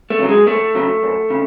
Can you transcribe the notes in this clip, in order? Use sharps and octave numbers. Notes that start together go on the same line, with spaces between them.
A3
C#3 F#3
G#3
F#2 A3
C#3 F#3
F#2
C#3